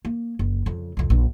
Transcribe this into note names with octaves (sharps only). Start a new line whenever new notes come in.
A#3
F#1
F2 C#3
C2 F2
A#1 F#2